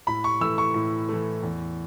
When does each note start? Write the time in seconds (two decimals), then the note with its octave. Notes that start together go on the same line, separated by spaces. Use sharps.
0.07 A2 B5
0.24 C#6
0.40 E3 A3 E6
0.58 C#6
0.74 A2
1.09 E3 A3
1.43 E2